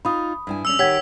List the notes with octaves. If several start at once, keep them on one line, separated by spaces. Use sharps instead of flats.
D#4 F4 B5 D#6
G2 E4 G#5
F2 C#4 E6 F7
D#3 G4 C#5 F#5 G#6 B6